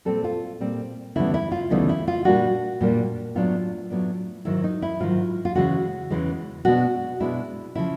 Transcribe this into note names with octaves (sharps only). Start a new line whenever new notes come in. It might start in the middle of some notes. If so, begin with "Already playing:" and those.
A#2 G3 C4 A4
F4
A#2 G3 C4
D2 C#3 E3 G3 B3 E4
E4
F4
D2 C#3 E3 G3 B3 D#4
E4
F4
A#2 G3 A#3 D4 F#4
A#2 G3 A#3 D4
A2 F#3 B3 D4 F4
A2 F#3 B3 D4
G#2 D#3 F#3 E4
D#4
E4
G#2 D#3 F#3 F4
F4
E2 C#3 E3 G#3 F#4
E2 C#3 E3 G#3
B2 G#3 B3 D4 F#4
B2 G#3 B3 D4 E4
C#3 F3 E4